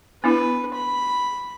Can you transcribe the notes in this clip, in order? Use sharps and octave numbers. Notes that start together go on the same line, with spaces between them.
B3 D4 E4 B4
B5